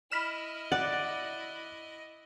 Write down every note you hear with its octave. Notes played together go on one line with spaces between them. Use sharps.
E4 D#5 B5 F6 E7
D5 F#5